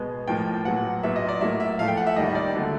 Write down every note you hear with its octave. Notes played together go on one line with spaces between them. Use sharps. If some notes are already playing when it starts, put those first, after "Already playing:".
Already playing: B2 G#3 B3
A2 F3 A#3 G5
A#2 F#3 B3 F#5
A#2 F#3 B3 E5
D#5
D5
A2 F#3 A#3 E5
E5
A2 F3 A3 F5
G5
F#5
E5
D#2 D#3 G3 A#3 D#5
D5
D3 F#3 A3